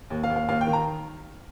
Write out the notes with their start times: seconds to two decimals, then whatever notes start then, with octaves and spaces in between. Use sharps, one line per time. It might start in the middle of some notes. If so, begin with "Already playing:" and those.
0.10 D#2
0.24 F5
0.30 D#2
0.36 F5
0.48 D#2 F5
0.61 G5
0.67 D#3
0.73 A#5